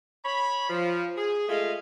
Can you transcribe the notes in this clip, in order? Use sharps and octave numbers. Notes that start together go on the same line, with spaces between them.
C#5 B5
F3
G#4
G#3 A3 F4 G#4 D#5 F5